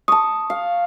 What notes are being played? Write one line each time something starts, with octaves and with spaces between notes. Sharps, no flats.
A5 C#6 D#6
F5